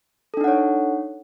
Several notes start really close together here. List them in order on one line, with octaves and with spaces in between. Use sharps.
A4 D4 D#4 F#5 C#5